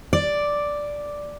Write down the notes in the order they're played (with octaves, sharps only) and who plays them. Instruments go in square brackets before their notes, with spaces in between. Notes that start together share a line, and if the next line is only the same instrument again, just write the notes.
[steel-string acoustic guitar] D5